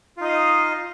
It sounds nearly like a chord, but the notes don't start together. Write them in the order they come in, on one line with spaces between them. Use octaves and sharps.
F4 D#4 D#5 F5